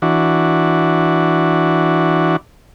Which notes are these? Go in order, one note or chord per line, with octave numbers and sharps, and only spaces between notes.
E3 D4 F#4